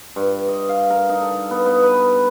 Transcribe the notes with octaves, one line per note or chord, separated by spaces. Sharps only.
G2
D#5
F5
A#4
D#4
A4
B3
B3
B4